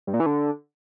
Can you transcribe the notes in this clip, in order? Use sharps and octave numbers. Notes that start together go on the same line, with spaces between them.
G2
A#2
E3
D3